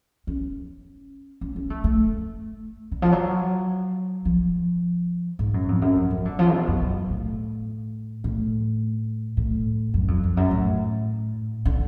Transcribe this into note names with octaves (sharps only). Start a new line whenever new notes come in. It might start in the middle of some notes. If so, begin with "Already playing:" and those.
C#4
C#4
C#4
A3
A3
D3
F3
F#3
F3
G#2
F#2
F2
F#2
F3
F3
D3
F3
B2
F#2
F#2
A2
A2
A2
F#2
F2
F2
F#2
A2
D3